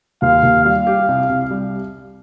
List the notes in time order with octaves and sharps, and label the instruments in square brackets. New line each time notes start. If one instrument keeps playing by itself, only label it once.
[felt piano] D#2 [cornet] F5
[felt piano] D#2
[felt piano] G3 [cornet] F5
[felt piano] G4
C2
C2
G3